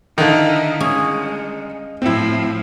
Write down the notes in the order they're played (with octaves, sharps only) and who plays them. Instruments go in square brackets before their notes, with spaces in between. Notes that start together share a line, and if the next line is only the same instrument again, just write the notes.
[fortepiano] D3 D#3 [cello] D#4 E4 [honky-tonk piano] D#5 F5
[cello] G#3 [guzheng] C#4 G#4
[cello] A2 F3 [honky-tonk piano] C4 E4